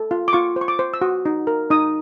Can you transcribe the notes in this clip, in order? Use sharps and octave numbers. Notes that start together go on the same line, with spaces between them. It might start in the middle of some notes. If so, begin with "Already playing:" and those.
Already playing: A4
F4
D6
F4 C#6
C5
C#6
D6
C5
E6
F#4 D#6
D#4
A#4
D#4 D#6